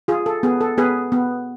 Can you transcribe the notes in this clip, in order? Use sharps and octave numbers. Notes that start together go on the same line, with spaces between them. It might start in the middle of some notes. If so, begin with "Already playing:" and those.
F4 G#4
A4
B3 G#4
A4
B3 G#4 B4
B3